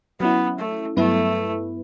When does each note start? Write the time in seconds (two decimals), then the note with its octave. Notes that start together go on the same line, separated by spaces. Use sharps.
0.20 F#3 B3 C#4 E4
0.59 A3
0.97 G2 F#3 A3 B3 E4 B4